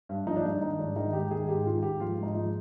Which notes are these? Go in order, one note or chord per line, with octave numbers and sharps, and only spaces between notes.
G2
F3 D#4
D4
G2 D#4
D#3 D#4
G#2 D4
D#3 D#4
G#2 G4
D#3 G#4
G#2 G4
D#3 F4
G#2 G4
F3 F4
G#2
D#4
F3